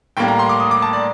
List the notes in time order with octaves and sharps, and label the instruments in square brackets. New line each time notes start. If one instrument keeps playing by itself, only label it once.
[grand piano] A2 G3 A#3 G5
A#5
C6
D6
D#6
D6
A5
D5